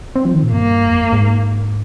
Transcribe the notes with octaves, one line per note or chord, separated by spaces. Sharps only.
C4
F3
D#3
A#2
G2 A#3
F2
G#2